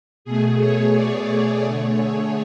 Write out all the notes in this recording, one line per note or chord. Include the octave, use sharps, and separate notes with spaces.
B2 A3 G#4
C#5
D5
D3 A3 C#5
G#4